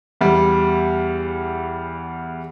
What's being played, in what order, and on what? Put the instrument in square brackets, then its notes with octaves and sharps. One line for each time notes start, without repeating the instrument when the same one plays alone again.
[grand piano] E2 G3